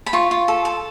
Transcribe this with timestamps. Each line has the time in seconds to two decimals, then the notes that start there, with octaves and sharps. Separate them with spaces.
0.06 B5
0.13 F4 C#6
0.31 F4
0.48 A4
0.65 A4